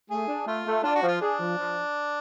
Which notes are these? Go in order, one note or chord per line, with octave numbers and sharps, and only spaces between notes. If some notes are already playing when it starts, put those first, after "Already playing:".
A3 G#4
D4
A3 F4
A3
D4 F4
F#4
F3
F4
D4 G#4
F3
F3